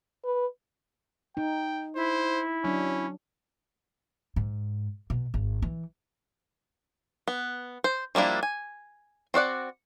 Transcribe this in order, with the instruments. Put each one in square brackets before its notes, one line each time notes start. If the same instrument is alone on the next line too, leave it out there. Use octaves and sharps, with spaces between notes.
[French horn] B4
[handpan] D#4 [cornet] G5
[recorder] E4 [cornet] C5
[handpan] F#3 D4 [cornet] C#4
[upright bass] G#2
B2
G#1
E3
[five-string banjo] B3
C5
F3 G3 A#3 D4 E4
G#5
C4 F#4 D5 F#5